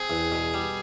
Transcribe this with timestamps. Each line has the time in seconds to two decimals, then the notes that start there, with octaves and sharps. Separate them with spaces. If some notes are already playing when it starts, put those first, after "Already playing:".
Already playing: C4 G#4
0.10 E2
0.32 B2
0.54 G3